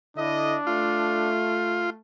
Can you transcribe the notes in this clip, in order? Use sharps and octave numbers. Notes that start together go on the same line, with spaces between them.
D3 D4 E4 D#5
A3 F4